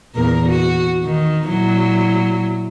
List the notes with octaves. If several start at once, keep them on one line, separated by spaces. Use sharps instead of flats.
E2 A#2 A#4
F#4
D#3
A#2 F#3 E4